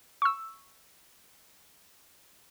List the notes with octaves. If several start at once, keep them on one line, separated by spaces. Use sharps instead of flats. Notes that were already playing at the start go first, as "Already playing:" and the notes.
C#6 E6